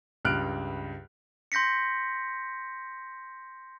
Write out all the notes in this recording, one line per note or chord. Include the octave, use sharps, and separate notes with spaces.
C#2 G2 F6 F#6 D7
C6 G6 A#6 B6 C#7